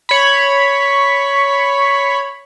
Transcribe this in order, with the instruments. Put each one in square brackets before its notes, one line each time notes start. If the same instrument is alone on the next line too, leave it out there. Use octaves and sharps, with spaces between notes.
[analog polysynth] C#5 B5